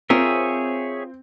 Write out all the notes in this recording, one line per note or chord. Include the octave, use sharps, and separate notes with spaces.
C4 F4 G#4 A#4 C#5 E5